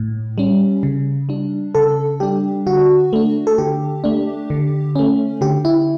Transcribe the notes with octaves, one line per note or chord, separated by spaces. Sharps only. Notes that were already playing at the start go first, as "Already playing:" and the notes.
Already playing: A2
G3 C#4
C#3
G3 D4
C#3 A4
G3 D4 G4
D3 F#4
A3 D4
A4
D3 G4
A3 D4
D3
A3 C#4
D3 G4
E4